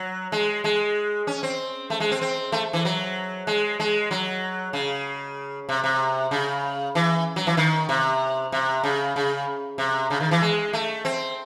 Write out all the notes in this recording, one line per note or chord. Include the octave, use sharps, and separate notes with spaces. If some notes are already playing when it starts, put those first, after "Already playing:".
Already playing: F#3
G#3
G#3
C#4
C4
A3
G#3
C4
C4
A3
E3
F#3
G#3
G#3
F#3
C#3
C3
C3
C#3
E3
F#3
E3
D#3
C3
C3
C#3
C#3
C3
C#3
D#3
E3
G#3
A3
C4